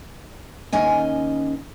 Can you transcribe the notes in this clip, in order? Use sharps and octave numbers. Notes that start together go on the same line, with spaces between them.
D#2 C#4 D#5 G#5